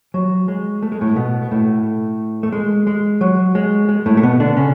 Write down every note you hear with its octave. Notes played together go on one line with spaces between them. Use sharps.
F#3
G#3
A3
G#3
A2 A3
B2 B3
A2 A3
A3
G#3
G#3
F#3
G#3
G#3
A2 A3
A3
B2 B3
D3 D4
C#3 C#4